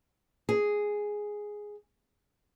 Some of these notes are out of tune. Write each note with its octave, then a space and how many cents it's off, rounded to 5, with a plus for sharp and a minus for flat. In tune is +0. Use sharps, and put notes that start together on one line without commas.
G#4 +0